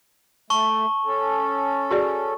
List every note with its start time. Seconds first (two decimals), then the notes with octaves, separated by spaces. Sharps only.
0.50 A3 A5 C#6
1.05 C#4 A4
1.91 F#4 G#4 D5